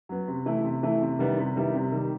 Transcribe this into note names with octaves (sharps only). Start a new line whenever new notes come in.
F#3 B3
C3
E3 A3 E4
C3
E3 A3 E4
C3
D#3 G3 B3 E4
C3
D#3 G3 B3 E4
C3
D#3 G3